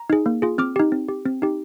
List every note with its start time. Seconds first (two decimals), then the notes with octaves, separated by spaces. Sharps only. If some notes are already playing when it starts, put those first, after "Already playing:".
Already playing: A#5
0.10 D#4 G#4
0.26 A#3
0.42 F4 G#4
0.58 C4 D6 F6
0.76 D#4 G4
0.92 C4
1.09 G4
1.26 C4
1.42 D#4 G4